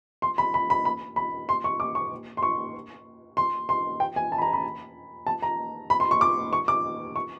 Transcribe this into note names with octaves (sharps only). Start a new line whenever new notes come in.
C6
B5
B5
B5
B5
B5
C6
C#6
D6
C#6
C6
C#6
C6
C6
G5
G#5
A5
B5
A#5
B5
A5
A#5
B5
C6
C#6
D6
C#6
D6
C#6